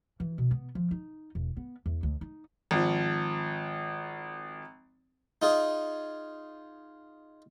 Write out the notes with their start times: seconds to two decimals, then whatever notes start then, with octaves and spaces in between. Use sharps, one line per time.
0.20 E3
0.38 B2
0.51 B3
0.75 F3
0.91 D#4
1.35 E1
1.57 B3
1.86 E2
2.03 D2
2.21 D#4
2.71 G#1 F3
5.42 D#4 F4 G#4